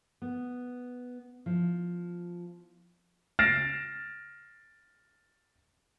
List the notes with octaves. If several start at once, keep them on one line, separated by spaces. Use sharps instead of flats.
B3
F3
F6 A6 A#6 C7 D7 E7